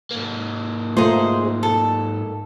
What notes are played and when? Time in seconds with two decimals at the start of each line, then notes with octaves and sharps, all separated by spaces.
0.11 G#2 A#3
0.97 A3 D#4 F4 G#4 C5
1.63 A4